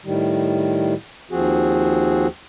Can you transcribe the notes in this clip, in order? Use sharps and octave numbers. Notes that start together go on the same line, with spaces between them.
A2 D#3 G3
D#2 F3 C4 F#4 G#4